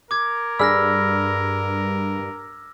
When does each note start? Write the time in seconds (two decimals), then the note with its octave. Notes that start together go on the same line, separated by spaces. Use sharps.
0.11 A#4 D6 G#6
0.59 G2 G#4 D5 B5 E6 F6 A#6